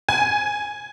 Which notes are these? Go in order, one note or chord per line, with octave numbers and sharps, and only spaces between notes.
G#5